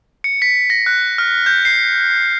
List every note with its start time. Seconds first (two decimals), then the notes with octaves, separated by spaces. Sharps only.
0.24 C#7
0.42 B6
0.70 A#6
0.86 F#6
1.18 F6
1.46 G6
1.65 C7